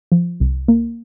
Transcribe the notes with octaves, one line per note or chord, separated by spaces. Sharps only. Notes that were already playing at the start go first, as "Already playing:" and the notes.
F3
C2
A#3